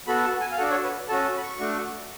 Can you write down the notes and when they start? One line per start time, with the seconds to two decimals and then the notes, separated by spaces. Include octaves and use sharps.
0.08 B3 F#4 A4 B5
0.24 A5
0.41 G#5
0.51 F5
0.58 D4 F#4 A4 F#5
0.71 C#5
0.84 B4
1.08 C#4 F#4 A4 A5
1.37 B5
1.42 C#6
1.59 A3 D4 F#4